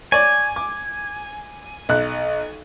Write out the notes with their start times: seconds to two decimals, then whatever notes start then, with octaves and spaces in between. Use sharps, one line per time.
0.12 C#5 D5 G#5
0.56 D6
1.89 B1 F#6